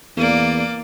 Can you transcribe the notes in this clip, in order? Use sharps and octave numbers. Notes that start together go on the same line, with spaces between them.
E2 A#3 D5